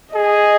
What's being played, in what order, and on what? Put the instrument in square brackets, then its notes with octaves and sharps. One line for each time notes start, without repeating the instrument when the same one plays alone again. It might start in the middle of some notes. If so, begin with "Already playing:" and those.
[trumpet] G#4 [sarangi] D#5